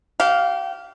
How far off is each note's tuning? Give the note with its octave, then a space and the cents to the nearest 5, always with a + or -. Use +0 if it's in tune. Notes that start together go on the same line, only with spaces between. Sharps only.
G4 -30 F5 +0